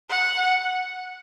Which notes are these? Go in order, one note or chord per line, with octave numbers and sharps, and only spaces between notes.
F#5